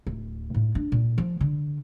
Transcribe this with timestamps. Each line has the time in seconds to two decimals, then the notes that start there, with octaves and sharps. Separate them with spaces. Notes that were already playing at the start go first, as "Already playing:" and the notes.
0.07 D1
0.54 A2
0.75 D4
0.92 A#2
1.18 F3
1.41 D3